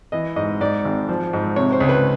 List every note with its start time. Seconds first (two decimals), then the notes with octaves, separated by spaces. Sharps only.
0.12 E3 D#5
0.36 G#2 D#5
0.61 G#2 D5
0.85 G#1
1.09 F3
1.33 G#2
1.56 C3 C#5
1.72 C5
1.80 C#2
1.89 B4